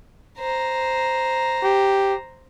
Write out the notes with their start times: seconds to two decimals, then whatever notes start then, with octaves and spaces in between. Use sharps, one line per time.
0.39 C5 A#5
1.64 G4